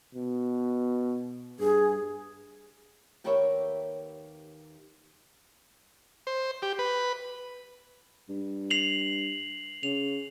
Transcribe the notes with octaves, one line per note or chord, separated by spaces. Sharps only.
B2
G2 G#4
D#2 G4 A#4 B4 C#5 E5
C5
G4
B4
G2
C7 F7 F#7
C#3 F7